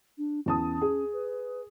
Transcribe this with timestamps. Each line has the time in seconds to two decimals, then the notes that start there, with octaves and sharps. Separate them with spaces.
0.18 D4
0.46 E2 C#4 A5 D#6
0.81 G#4
1.13 B4